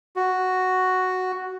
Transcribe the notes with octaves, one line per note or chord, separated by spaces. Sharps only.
F#4